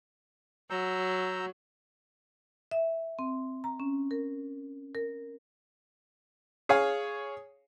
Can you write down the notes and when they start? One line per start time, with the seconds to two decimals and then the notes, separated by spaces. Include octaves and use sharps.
0.70 F#3 A#5 E6 G6
2.71 E5
3.19 C4
3.64 A#5
3.80 C#4
4.11 A#4
4.95 A#4
6.69 G#4 C#5 F5 G#5